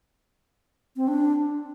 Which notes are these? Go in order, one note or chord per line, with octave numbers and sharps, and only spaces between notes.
C4
D4